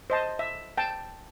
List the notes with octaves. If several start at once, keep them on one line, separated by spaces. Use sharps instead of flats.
C5 D#5 A5
E5
G5 A5